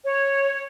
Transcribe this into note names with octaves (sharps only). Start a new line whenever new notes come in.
C#5